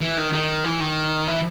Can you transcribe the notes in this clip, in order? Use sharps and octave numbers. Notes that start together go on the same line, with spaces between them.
E3
D#3
D#3
E3
D#3
E3